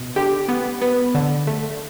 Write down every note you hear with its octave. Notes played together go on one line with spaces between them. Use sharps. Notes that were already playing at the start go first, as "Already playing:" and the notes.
Already playing: B2
D3 G4
B3
B3
D3
A3